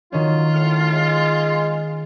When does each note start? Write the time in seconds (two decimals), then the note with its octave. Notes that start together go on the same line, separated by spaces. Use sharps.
0.12 D#3 F#3 C#4 F4
0.54 A2 F6 C#7
0.93 G#3